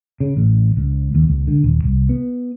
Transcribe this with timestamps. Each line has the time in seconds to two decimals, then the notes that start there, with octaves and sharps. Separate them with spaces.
0.20 C#3
0.37 A1
0.77 C#2
1.15 D#2
1.28 C#2
1.47 D3
1.64 D#1
1.84 C2
2.09 B3